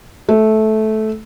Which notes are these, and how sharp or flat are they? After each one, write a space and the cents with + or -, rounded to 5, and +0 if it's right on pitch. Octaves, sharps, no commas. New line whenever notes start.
A3 -15